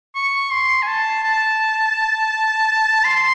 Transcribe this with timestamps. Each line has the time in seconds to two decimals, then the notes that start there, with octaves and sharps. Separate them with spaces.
0.15 C#6
0.51 C6
0.82 G#5
0.87 A5
1.23 A5
3.04 C6